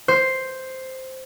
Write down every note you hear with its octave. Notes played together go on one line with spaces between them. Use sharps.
C5